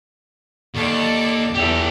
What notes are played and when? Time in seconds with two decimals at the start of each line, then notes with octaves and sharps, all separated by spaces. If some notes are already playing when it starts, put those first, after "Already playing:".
0.74 D#2 A4 D5 A5
1.55 E2 G4 A4